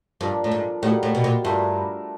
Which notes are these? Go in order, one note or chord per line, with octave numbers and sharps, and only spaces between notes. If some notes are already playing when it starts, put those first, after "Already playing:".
G2 F3 A#3 D4
A2
G#2
A2 G3 A#3 D#4 F#4
A2
B2
A#2
G2 A3 D4 F4 A#4